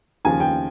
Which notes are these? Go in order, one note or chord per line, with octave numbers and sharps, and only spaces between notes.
D#2 C#3 F3 G#5
G5